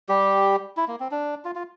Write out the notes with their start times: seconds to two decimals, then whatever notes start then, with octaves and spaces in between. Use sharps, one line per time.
0.09 G3 G4
0.77 E4
0.88 A#3
1.00 C4
1.11 D4
1.45 F4
1.55 F4